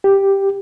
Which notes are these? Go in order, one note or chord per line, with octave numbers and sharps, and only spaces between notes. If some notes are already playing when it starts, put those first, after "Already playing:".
G4